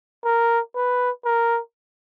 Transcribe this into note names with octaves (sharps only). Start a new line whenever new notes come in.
A#4
B4
A#4